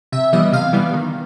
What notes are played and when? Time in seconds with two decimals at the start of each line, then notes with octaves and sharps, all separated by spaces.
0.12 C3 E5
0.33 E3 G3 B3 D#5
0.52 C3 F5
0.73 E3 G3 B3
0.93 D#3